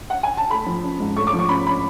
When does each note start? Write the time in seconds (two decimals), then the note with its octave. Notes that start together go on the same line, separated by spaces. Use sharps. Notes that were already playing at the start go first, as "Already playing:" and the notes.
0.10 F#5
0.23 G#5
0.37 A5
0.50 A3 B5
0.66 F3
0.84 C#4
1.00 G#2
1.16 A3 C#6
1.27 D6
1.33 F3
1.39 C#6
1.49 C#4 B5
1.67 B5